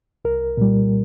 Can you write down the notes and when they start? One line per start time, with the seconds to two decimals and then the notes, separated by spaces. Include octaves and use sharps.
0.25 C2 A#4
0.57 A#2 G3